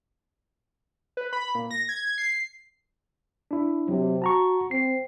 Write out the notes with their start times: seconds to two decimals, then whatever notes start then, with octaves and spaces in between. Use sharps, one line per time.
1.17 B4
1.33 B5
1.55 A#2
1.71 A#6
1.89 G#6
2.18 C7
3.51 D4 E4
3.88 C3 F#3
4.22 F#4 A5 A#5 C#6
4.71 C4 C7